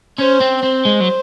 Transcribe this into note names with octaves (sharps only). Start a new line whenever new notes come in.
C#4 C5
C4
C4 C5
G#3
F#3